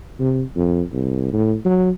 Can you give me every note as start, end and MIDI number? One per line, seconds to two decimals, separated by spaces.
0.19 0.42 48
0.56 0.82 41
0.92 1.32 36
1.33 1.55 45
1.65 1.90 54